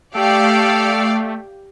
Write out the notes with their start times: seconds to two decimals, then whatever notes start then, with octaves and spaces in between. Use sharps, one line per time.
0.15 A3 G4 A4 D5 F5 G5